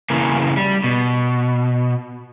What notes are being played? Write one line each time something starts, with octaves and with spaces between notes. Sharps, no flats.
C#3 E3 A#3
G3
B2